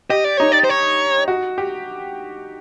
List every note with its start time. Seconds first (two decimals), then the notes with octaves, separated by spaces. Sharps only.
0.10 G4 D#5
0.24 D5
0.37 D#4 C#5
0.52 D5
0.64 C5
0.69 C#5
1.28 F#4
1.58 G4